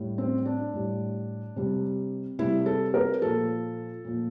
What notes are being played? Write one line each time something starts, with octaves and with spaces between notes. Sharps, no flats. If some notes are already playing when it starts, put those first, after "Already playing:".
Already playing: A2 G3
C4
D4
A2 G3
C3 G3
C3 G3 E4
A4
A#4
A#2 F3 A4
A#2 F3